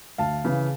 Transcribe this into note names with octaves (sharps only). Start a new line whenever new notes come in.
D2 F5 A5
C#3 E3